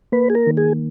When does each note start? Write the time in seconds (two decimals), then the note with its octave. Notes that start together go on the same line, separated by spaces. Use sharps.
0.12 A#3 B4
0.30 G#4
0.35 A#4
0.47 D#3
0.57 G#4